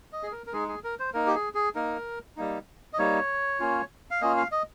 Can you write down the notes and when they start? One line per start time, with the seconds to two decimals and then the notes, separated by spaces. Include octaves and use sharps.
0.13 D#5
0.23 G#4
0.32 A#4
0.47 A#4
0.53 G#3 D#4 G#4
0.68 G#4
0.84 A#4
1.00 C5
1.14 A#3 D#4 A#4
1.27 G4
1.35 G#4
1.55 G#4
1.75 A#3 D#4 A#4
2.37 G3 A#3 D#4
2.93 D#5
2.98 G3 A#3 D#4 C#5
3.60 A#3 C#4 F4
4.11 F5
4.21 A#3 C#4 F4 D#5
4.37 F5
4.52 D#5